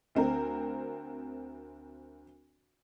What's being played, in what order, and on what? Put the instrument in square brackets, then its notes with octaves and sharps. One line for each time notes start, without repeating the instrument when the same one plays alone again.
[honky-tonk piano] D2 C4 A#4